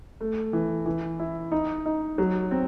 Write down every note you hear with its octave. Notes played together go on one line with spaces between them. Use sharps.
A3
E3
E3
E4
D#4
D#4
F#3
C4